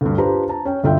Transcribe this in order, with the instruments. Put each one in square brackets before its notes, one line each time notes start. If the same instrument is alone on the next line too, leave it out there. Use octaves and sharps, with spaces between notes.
[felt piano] D2 G2
D4 F4 G4 B4 C5 A#5
A5 A#5
C#4 G5
G1 D2 G2 F4 E5 G5